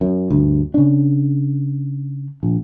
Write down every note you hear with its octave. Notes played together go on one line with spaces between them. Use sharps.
F#2
D2 G2
C#3 D4
A#1